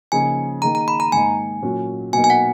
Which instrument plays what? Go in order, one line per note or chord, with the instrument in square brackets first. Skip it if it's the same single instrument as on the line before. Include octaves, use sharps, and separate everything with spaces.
[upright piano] C#3 F3 A#3 D#4 [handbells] G#5
[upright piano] D#3 A#3 D#4 G#4 [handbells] A#5
[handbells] A#5
B5
A#5
[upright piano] G#2 D#3 A#3 D#4 [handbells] G#5
[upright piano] A#2 F#3 C#4 F#4
[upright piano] B2 F#3 A#3 D#4 [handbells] G#5
[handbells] G#5
F#5